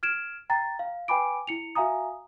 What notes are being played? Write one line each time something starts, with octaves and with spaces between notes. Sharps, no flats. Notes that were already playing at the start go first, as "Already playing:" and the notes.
F6 G#6 D7 E7
G5 A#5 A6
F5
B4 G5 G#5 B5 D6 D7
E4 C#7 F7
F#4 E5 F5 G#5 A#5 D#6